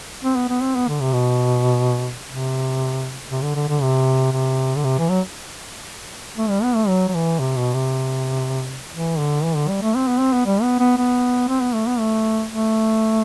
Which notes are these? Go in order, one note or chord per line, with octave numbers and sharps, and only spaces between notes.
C4
B3
B3
C4
B3
D3
C3
B2
C3
C3
D3
D3
D3
C3
C3
D3
C3
E3
F#3
A3
G3
B3
A3
F#3
F#3
E3
C3
B2
C3
E3
D3
E3
D3
G3
A3
C4
B3
C4
B3
G3
B3
B3
B3
C4
B3
A3
B3
A3
A3